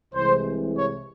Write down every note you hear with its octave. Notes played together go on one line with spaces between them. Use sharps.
C2 C3 E3 G#3 C5
C#5